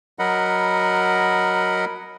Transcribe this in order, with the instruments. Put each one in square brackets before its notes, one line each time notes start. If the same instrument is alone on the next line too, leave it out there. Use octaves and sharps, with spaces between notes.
[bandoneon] F#3 A#4 D#5 F#5 B5